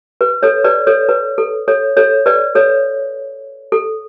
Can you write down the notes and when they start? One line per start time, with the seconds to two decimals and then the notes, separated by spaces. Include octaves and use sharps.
0.21 B4
0.43 A4 C#5
0.65 B4 D5
0.87 A4 C#5
1.09 B4
1.38 A4
1.68 A4 C#5
1.97 A4 C#5
2.26 B4 D5
2.55 A4 C#5
3.72 A4